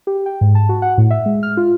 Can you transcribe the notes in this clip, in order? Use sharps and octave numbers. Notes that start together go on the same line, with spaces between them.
G4
G5
G#2
A5
F#4
F#5
A2
E5
G#3
F6
F4